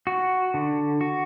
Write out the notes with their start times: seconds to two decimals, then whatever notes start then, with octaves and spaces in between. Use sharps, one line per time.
0.07 F#4
0.54 D3
1.01 F#4